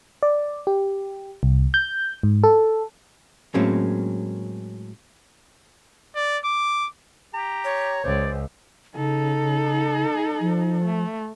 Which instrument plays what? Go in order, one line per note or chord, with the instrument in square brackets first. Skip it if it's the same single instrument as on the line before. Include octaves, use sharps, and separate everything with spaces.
[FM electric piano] D5
G4
C2
G6
G#2
A4
[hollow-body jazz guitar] A2 F#3 G#3 A#3 C4 C#4
[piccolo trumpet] D5
D6
[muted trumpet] G4 [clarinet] A#5
[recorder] C#5
[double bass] C#2 [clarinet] C5 [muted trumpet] D5
[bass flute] C#3 [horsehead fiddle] D#4 A4
[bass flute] F3
[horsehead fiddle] A3